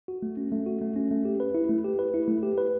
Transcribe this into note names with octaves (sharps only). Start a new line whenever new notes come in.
F#4
A3
C#4
A3
F#4
A3
C#4
A3
G4
B4
E4
A3
G4
B4
E4
A3
G4
B4